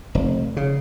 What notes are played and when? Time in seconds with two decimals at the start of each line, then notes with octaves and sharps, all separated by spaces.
0.15 F1
0.57 C#3